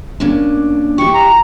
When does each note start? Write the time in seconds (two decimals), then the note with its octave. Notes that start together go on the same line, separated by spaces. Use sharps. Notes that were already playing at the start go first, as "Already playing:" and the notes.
0.20 A#3 C#4 D4
0.98 E4 G4 C#6
1.14 A#5